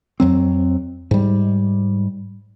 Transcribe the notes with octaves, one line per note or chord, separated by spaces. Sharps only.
F2 F#3 C4
G#2 G3